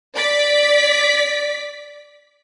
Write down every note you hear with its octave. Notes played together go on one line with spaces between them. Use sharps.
D5 B6